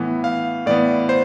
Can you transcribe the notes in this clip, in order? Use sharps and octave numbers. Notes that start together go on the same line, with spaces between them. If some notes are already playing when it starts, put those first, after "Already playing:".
Already playing: A2 E3 B3
F5
A2 E3 B3 D5
C5